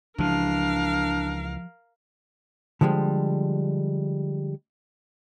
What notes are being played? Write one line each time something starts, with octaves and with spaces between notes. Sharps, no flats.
C#2 E3 F3 D4 G4 A#4 F5 A5
D3 F3 G3 G#3